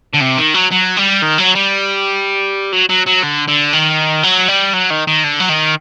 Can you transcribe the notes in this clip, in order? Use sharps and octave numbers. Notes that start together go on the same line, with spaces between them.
D3
C3
D#3
F#3
F#3
G3
D#3
F#3
G3
F#3
F#3
F#3
D3
D3
D#3
F#3
G3
F#3
D#3
D#3
D3
F#3
D#3